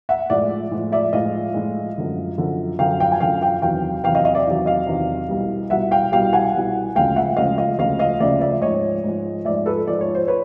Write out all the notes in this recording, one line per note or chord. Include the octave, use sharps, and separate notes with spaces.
E5 F#5
A2 F3 G#3 D5 E5
A2 F3 G#3
D5 E5
A2 F3 G#3 D#5 F5
A2 F3 G#3
F#2 D3 F3
F#2 D3 F3
F#2 D3 F3 F5 G5
F5 G5
G#5
F#2 D3 F3 F5 G5
F5 G5
E2 C3 D#3 F#3 F5 G5
E2 C3 D#3 F#3 F5 G5
D#5 F5
D#5 F5
D5 E5
E2 C3 D#3 F#3
D#5 F5
E2 C3 D#3 F#3
C2 B2 G3
C2 B2 G3 E5 F#5
F5 G5
C2 B2 G3 F5 G5
F#5 G#5
C2 B2 G3
D2 C#3 F3 G#3 F5 G5
E5 F#5
D2 C#3 F3 G#3 D#5 F5
D#5 F5
D2 C#3 F3 G#3 D#5 F5
D#5 F5
D2 C#3 F3 G#3 D5 E5
D5 E5
G#2 F3 G#3 C#5 D#5
G#2 F3 G#3
G#2 F3 G#3 D5 E5
A4 B4
G#2 F3 G#3 D5
C#5
C5
B4 C#5